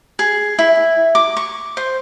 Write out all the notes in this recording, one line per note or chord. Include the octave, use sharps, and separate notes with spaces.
G#4
E4
D6
C#6
C5